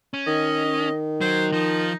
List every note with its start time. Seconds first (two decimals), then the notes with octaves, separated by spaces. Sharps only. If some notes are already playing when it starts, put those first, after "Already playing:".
0.14 C#4
0.27 D#3 D#5
1.21 F#3 C5
1.52 F3 D#4